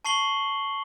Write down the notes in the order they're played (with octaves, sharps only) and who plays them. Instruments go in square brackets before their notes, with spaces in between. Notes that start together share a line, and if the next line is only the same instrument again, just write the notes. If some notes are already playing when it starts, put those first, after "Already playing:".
[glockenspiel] A5 C#6 C7 F#7 G7